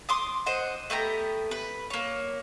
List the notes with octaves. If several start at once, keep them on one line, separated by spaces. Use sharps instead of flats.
C6 D6 D#6
C5 D#5 F#5
A3 B3 G4 A#5
B4
A#3 C#5